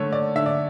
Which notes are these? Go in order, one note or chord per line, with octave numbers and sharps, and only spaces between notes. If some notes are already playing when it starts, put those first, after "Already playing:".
Already playing: D3 A3 C#5
D5
D3 E5
D5